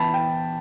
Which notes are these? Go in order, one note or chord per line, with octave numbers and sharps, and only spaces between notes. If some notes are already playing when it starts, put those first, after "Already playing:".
Already playing: E3 B3 E4 G5 A5 B5
G5